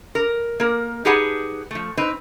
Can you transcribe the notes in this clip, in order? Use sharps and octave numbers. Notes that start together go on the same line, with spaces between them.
A#4
A#3 A#4
D#4 G4 G#4 B4 F#5 A5
F3 A3
C4 D#4 B4